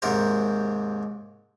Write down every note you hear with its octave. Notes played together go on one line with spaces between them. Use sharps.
D#2 G#2 C3 A#4 C5